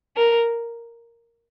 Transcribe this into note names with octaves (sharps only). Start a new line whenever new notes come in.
A#4